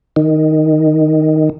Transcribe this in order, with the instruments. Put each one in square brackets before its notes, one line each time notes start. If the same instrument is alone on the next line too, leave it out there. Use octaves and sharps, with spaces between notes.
[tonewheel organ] D#3